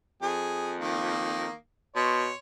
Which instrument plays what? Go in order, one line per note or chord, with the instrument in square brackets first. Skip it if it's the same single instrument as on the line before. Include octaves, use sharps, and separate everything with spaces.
[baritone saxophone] F2 [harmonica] G#4
[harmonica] D#3 A#3
[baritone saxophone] B2 [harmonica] C#5 C6